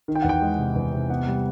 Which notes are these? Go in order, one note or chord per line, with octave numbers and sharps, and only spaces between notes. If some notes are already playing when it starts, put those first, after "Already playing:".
D#3
G5
E2 F#5
G5
G#3
C3
E2
C3
B3 F#5
G3